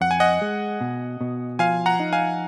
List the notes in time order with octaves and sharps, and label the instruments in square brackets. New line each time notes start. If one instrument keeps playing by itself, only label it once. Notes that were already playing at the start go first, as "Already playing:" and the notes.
[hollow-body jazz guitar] F2 [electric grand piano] F#5
[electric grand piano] G#5
D#5 F#5
[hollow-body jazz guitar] G#3
B2
B2
[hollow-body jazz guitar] F3 [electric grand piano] F5 G#5
[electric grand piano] F#5 A#5
[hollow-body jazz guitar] D#4
[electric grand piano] F5 G#5